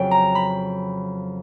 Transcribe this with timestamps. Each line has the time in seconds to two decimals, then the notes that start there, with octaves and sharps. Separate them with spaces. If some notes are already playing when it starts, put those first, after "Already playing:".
Already playing: F2 C#3 F#3 G5
0.11 A#5
0.35 B5